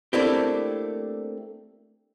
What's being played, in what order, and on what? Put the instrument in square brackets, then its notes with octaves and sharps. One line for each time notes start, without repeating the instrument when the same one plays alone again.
[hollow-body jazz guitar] A3 A#3 C4 D4 E4 G4